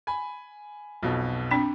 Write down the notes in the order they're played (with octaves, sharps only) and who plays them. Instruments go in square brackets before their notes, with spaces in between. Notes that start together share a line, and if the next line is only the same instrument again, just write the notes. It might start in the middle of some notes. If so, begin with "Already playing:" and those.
[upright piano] G#5 B5
B1 F2 B2
[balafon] C4 D4 G5